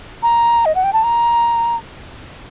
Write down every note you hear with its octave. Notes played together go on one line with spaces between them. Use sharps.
A#5
D#5
F#5
G5
A5
A#5